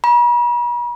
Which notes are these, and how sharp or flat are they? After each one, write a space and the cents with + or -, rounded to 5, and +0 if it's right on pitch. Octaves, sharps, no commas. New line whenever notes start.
B5 -45